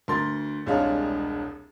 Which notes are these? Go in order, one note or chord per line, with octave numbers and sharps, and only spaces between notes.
D2 A#4 C6 A6
E1 C2 G#3 D4 C#5 F5